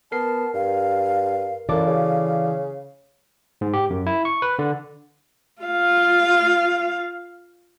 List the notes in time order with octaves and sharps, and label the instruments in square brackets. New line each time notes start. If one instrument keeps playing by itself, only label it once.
[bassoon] B3 [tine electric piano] A#4 C7 [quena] A5
[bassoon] G2 [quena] F5
[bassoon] F#2 [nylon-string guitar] E3 F#4 A4 [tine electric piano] D5 D6 [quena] F5
[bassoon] C#3
[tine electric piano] G#2
G4
F#2
E4
C#6
B4
D3
[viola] F4 F5